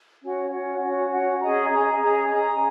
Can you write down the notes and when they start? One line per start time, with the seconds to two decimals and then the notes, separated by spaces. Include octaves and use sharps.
0.22 C#4 F#4 C#5 F#5
0.51 C#4 F#4 C#5 F#5
0.81 C#4 F#4 C#5 F#5
1.11 C#4 F#4 C#5 F#5
1.41 C#4 G#4 D#5 A#5
1.70 C#4 G#4 D#5 A#5
2.00 C#4 G#4 D#5 A#5
2.30 C#4 G#4 D#5 A#5